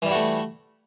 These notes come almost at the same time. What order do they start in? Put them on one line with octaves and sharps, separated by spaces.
E3 G3 E4 F#4 A3